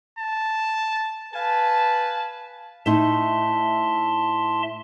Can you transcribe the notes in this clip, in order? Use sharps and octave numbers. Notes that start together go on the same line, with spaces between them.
A5
B4 F5 G#5 A5
A2 D#4 E5 A5 C6